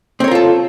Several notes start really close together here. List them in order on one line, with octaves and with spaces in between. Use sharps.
C4 C#5 A#4 F4 A4